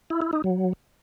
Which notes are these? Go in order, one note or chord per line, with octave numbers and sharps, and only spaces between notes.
E4
E4
D#4
F#3